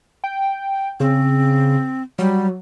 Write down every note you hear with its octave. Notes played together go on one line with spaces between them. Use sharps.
G5
C#3 C4
F#3 G3